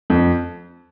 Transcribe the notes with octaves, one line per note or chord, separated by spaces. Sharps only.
F2